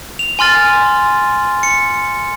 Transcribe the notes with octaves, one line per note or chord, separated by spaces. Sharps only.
F7
G#5 C6 F6 A6
C#7